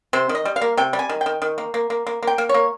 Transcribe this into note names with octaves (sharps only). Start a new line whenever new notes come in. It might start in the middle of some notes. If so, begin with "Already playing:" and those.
C3 C5
D#3
D#5
G3
F5
A#3
C3 G5
G3
G#5
D#3
G5
D#3
D#3
A#3
A#3
A#3
A#3
A#3 G5
A#3
A#3 C#5